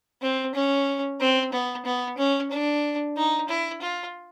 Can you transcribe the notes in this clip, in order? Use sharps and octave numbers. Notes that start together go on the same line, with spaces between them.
C4
C#4
C4
B3
B3
C#4
D4
D#4
E4
F4